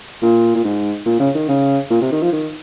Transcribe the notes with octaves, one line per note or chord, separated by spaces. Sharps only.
A#2
A#2
G#2
A#2
C#3
D#3
C#3
A#2
C3
D#3
F3
D#3